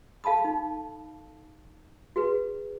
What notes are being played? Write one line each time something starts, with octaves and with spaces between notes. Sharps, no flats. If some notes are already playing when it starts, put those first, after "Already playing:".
A4 F5 A5 B5 D#6
D#4
F#4 G#4 B4